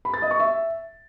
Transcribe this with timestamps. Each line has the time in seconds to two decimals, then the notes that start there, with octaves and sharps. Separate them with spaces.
0.05 B5
0.14 A6
0.22 D#5
0.31 C#6
0.39 E5